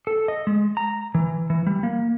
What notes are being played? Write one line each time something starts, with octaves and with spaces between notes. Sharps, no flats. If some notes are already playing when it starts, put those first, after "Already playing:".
A4
D#5
G#3
A#5
E3
E3
G3
A#3